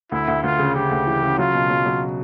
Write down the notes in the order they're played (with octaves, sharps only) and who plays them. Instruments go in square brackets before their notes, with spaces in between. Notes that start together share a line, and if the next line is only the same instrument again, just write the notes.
[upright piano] D2 [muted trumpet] E4
[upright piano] D2
[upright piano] D2 [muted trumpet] F4
[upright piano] C#3
[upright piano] C#3 [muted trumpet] G4
[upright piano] D2
E3
C#3
[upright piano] F#3 [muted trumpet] F4
[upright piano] B2
F#3
F#3